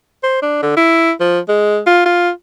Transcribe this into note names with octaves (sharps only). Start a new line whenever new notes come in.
C5
D4
D3
E4
F3
G#3
F4
F4